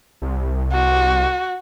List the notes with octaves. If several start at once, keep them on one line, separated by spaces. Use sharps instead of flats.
C2
F#4